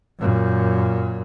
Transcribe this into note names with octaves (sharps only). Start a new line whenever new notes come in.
F#2 A#2